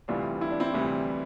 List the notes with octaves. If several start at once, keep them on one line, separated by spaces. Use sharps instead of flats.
D2 C3 E3 G3 D4 F4
E4
D4
C4 E4
D2 C3 E3 G3